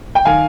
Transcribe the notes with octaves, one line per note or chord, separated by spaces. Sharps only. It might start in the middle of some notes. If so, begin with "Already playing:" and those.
G5
D#3 F5 G#5